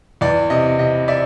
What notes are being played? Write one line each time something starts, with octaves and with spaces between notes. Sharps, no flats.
E2 D5
C3 D#5
C3 D#5
D5 E5